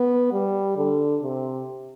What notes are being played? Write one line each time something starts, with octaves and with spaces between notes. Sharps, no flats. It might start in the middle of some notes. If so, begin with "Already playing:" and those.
Already playing: B3
G3
D3
C3